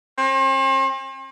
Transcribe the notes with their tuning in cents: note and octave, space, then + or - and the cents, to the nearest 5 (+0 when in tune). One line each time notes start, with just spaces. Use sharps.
C4 +45